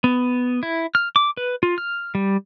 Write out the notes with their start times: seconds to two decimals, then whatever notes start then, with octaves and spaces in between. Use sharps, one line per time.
0.04 B3
0.63 E4
0.95 F6
1.16 D6
1.37 B4
1.63 F4
1.78 F6
2.15 G3